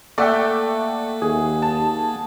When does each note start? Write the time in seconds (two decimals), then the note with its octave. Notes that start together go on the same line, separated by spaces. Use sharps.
0.18 A3 A#3 D5 E5 F#5 G5
1.22 D#2 G#4
1.62 A5